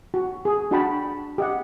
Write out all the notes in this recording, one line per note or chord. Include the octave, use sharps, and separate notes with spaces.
F#4
G#4
D4 F#4 F#5 G5 A5 B5
G4 D#5 F#5